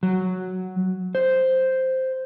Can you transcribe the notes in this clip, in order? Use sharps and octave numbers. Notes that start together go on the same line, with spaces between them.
F#3
C5